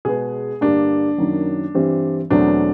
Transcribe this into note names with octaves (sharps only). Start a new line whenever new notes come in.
B2 G#3 B3 G#4
G2 D3 G3 A#3 D4
F#2 D#3 F#3 A#3
G2 E3 G3 C4
E2 B2 F#3 A3 C4 D4